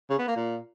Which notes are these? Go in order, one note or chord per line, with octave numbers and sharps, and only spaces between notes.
C#3
B3
A#3
A#2